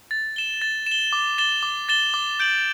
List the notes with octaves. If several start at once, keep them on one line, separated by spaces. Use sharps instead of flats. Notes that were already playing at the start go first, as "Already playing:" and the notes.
A6
E7 G7
A6
E7
G7
D6
A6 E7 G7
D6
A6 E7 G7
D6
G6 D7 F#7